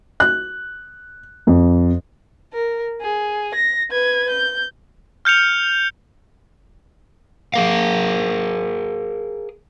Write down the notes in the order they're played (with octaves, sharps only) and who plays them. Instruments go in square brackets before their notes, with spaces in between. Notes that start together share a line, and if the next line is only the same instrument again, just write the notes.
[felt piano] F#6
F2
[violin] A#4
G#4
A#6
B4 G#6
G6
[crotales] F6 G6 C#7 F7
[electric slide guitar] G#4 A#4 F5